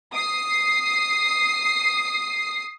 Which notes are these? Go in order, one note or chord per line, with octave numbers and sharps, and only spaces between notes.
D#6 C7